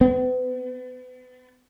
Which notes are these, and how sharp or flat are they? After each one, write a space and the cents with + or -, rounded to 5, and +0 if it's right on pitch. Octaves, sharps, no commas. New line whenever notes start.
B3 +40